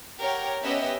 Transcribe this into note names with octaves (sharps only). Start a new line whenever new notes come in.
G4 A#4 C#5 F#5 G5
B3 C#4 G4 B4 D#5 E5